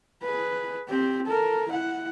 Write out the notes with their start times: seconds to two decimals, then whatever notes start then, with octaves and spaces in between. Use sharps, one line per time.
0.23 G#4 B4
0.89 C4 G4
1.26 A4 A#4
1.69 E4 F#5